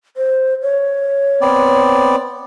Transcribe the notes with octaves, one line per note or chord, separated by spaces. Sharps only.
C5
C#5
B3 C4 D5